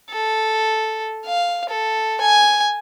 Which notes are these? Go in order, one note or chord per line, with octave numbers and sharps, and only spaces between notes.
A4
F5
A4
G#5